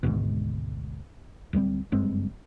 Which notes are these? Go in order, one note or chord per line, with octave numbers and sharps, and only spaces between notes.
G#1 D2 G#2 B2
D1 G2 G3 C4
F#1 G2 G#3 C4